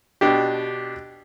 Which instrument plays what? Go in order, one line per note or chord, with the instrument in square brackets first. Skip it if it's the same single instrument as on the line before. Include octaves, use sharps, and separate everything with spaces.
[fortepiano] B2 D4 G4